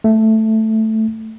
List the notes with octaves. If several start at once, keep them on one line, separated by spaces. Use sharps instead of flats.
A3